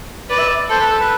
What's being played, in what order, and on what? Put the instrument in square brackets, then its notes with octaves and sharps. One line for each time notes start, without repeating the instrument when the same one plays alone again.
[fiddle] B4 [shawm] D5
[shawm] E5
D5
[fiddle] A4 [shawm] C5
[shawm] B4
A4
B4